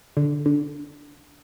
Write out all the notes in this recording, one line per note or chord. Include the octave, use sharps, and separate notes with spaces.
D3
D3